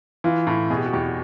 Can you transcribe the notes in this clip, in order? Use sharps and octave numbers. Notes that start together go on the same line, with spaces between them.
E3 F4
A2
B2 G#4
G4
F#4
E2 G4